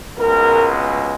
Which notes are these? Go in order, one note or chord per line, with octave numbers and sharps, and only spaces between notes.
C#2 B2 G#3 A#4